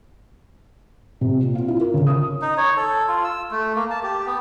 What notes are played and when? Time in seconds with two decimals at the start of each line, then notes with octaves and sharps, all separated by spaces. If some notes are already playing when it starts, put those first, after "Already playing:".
1.21 C3
1.43 A#2
1.55 F4
1.68 E4
1.81 A#4
1.94 C#3
2.06 D#6
2.42 D#4
2.57 C#5
2.77 A4
3.08 F4
3.24 E6
3.51 A3
3.75 A#3
3.90 A5
4.03 G4
4.26 B3